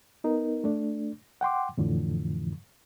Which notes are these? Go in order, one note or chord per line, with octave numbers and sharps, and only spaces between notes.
B3 D#4 A#4
A3 D4
F#5 G5 C6 D6
F2 A2 D3 E3 F3